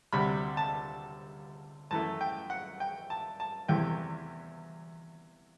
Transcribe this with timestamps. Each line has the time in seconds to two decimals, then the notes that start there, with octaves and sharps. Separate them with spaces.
0.13 D2 C3 G3 B5
0.57 A5
1.91 F#2 E3 A3 A5
2.21 G5
2.50 F#5
2.80 G5
3.10 A5
3.40 A5
3.68 E2 C3 E3 A3 G5